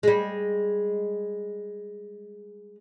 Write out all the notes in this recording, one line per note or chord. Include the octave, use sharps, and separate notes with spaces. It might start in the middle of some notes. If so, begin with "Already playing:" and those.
G3 G#3